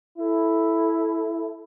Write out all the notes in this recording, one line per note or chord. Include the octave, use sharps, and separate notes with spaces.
E4 A4